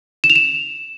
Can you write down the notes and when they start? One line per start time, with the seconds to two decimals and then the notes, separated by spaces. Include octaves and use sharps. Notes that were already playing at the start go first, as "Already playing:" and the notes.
0.24 E7
0.30 F7
0.36 E7